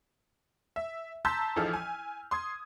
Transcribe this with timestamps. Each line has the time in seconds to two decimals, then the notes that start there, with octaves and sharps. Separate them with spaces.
0.76 E5
1.25 A5 A#5 C6 E6 G6 B6
1.56 A1 F3 D#4 G#4 A4 F6
1.73 G#5
2.31 C6 D#6 G#6